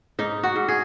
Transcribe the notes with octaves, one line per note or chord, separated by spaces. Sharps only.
G#2 D#4
F#4
G#2
G#4